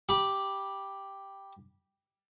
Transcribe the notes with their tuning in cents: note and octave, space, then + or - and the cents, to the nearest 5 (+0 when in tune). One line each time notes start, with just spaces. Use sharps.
G4 +0 B5 -20